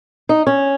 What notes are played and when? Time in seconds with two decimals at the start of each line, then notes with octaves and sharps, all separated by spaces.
0.29 D#4
0.47 C#4